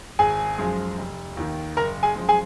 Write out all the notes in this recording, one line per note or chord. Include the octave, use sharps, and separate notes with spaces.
G#1 G#4 G#5
F#2 F3 G#3
F1
D#2 D#3
F#1 A#4 A#5
G#4 G#5
F#2 F3 G#3
G#4 G#5